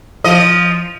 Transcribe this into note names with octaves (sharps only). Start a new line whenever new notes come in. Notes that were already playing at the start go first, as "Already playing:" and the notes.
F3 D#5